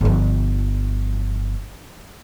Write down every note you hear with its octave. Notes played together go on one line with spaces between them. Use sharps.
G1 F3